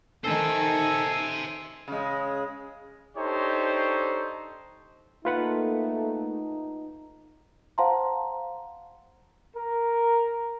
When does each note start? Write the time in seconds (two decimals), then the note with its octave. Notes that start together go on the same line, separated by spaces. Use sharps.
0.24 D#3 A4 C5 E5 G#5
1.88 C#3 G#3
3.17 D4 D#4 G4 A4 C5 C#5
5.25 A3 A#3 D#4 F4 B4 F#5
7.78 C5 F5 F#5 A5 A#5 C6
9.55 A#4